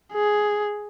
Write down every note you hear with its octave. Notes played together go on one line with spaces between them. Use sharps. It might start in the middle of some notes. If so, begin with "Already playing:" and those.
G#4